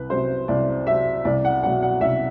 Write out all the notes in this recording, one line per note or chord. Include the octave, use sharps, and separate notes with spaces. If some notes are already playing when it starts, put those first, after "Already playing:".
Already playing: C2 B4
C3 F#3 C5
C2 D5
C3 F#3 E5
C2 D5
F#5
B2 F#3 F#5
F#5
C2 E5